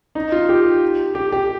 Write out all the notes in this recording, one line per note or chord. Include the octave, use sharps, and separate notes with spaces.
D#4
F4
G4
G4
G4